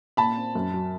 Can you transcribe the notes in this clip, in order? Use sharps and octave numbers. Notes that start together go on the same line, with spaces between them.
A#2 A5 B5
C4
F#2
F#3